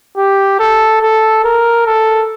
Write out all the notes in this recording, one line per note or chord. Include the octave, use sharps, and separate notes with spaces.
G4
A4
A4
A#4
A4